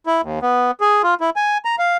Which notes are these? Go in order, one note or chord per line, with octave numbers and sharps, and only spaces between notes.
E4
D#2
B3
G#4
F4
E4
G#5
A#5
F5